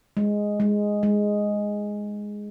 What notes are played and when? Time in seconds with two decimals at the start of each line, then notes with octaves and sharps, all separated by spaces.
0.17 G#3
0.60 G#3
1.03 G#3